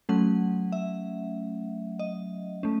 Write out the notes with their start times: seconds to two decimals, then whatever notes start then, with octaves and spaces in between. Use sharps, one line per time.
0.09 F#3 A3 C#4 F#5
0.72 E5
1.99 D#5
2.63 A3 C#4